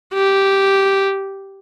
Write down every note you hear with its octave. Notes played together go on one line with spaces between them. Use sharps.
G4